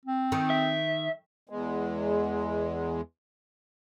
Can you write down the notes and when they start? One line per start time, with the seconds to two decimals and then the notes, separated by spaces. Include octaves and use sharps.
0.05 C4
0.32 D#3
0.50 E5
1.50 E2 G#3